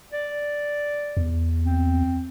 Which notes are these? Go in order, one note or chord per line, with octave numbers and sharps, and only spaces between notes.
D5
E2
C4